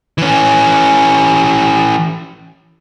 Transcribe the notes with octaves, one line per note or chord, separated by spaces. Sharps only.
E3 C#4